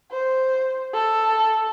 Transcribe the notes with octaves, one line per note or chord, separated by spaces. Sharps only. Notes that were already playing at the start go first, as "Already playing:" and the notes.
C5
A4